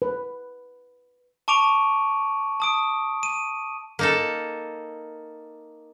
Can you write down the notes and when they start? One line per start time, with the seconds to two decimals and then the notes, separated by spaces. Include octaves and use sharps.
0.02 B4
1.48 A5 C#6 D6 D7 D#7 F7
2.60 A5 D#6 D7
3.23 D#7
3.99 A#3 D#4 A4